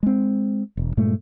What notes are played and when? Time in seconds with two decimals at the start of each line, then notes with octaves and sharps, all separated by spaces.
0.03 G#3 C4
0.77 E1
0.97 G2 A#2 G#3 A3